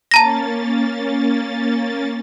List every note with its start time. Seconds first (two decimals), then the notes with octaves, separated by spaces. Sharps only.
0.11 A#3 C#4 A5 A#5 A6 A#6